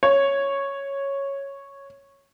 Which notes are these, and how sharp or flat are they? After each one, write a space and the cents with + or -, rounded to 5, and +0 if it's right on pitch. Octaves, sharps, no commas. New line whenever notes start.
C#5 -5